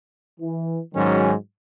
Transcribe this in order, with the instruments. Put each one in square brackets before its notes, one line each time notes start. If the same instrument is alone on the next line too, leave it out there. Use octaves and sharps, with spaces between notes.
[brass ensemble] E3
[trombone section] G#2 D#3 G#3 C#4 [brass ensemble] F#3